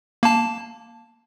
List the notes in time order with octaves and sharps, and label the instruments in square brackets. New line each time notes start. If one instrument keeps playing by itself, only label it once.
[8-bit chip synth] A#3 A5